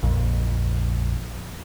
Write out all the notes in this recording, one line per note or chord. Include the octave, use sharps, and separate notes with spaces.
A#1 F2